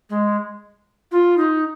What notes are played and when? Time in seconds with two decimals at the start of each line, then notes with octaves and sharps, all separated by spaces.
0.09 G#3
1.11 F4
1.37 D#4